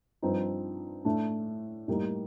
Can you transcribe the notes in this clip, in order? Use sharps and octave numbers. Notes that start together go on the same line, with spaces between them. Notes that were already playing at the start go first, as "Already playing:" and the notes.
G2 F3 C4 D#4
A2 A3 D4
A2 G3 A#3 D#4